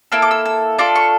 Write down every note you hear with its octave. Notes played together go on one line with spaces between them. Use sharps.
A#3 E4 A4 E6
D6
E6
E6
D4 F4 A4 D6
C#6